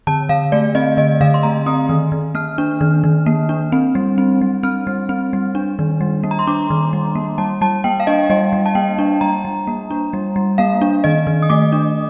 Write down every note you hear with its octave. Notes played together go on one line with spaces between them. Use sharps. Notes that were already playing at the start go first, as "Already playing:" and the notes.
D3 A5
D3 F5
A3 D5
C4 D#5
D3 D#5
D3 F5
C6
A3 A#5
C4 D#6
D#3
D#3
A#3 F6
D4
D#3
D#3
A#3
D4
C4
G3
C4
G3
C4 F6
G3
C4
G3
D4
D#3
G3
A#3
A#5
C6
D4 D6
D#3
G3
A#3
G3 A5
G3 A5
A#3 G5
F5
D4 D#5
G3 D#5
G3
A5
A#3 G5
D4
G3 A#5
G3
A#3
D4
G3
G3
A#3 F5
D4
D#3 D#5
D#3
D#6
A3 D6
D4